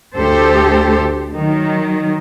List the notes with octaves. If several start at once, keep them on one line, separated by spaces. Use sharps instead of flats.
D2 G4 A4 C5
D#3 F#3